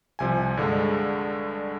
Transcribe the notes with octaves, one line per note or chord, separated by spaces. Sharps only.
C2 C3 F3 G#5
G2 D3 G#3